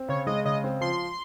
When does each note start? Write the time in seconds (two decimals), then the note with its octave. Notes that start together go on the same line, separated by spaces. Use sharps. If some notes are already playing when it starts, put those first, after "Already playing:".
Already playing: C4
0.08 C#3 C#5
0.27 G#3 D#5
0.45 C#3 D#5
0.64 C4
0.81 F3 C6